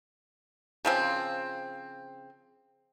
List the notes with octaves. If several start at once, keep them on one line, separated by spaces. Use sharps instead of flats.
C#3 F3 C4